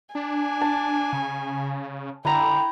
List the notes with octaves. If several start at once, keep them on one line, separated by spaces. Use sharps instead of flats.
D4 G#5
A5
C#3
D3 E4 G5 A#5